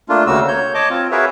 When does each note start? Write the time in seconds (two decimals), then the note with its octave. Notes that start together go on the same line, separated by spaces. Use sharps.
0.09 A3 A#3 D4 F4
0.27 D2 C#3 A#3 F#4 E6
0.48 C#5 G6
0.74 C#5 D#5 A5 D6
0.90 C4 F4
1.11 F#4 G#4 A#4 B4 C#5 E5